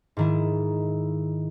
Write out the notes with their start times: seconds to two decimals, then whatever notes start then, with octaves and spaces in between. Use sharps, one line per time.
0.17 G#2 D#3 E4